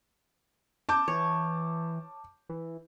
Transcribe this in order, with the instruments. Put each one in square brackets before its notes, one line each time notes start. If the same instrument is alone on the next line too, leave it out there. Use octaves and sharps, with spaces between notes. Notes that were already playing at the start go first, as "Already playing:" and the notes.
[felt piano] A5 D6 G6
[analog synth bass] E3 [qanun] C#5
[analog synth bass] E3